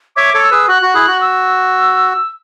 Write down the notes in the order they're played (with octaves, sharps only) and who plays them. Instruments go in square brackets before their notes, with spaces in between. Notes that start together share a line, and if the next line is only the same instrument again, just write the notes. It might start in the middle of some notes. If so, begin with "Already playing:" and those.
[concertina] C#5 E5 [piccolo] D6
[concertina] A4 C#5
[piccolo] E6
[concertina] G#4 B4
[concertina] F#4 [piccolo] F#6
[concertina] F#4
E4 G#4
F#4
[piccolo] E6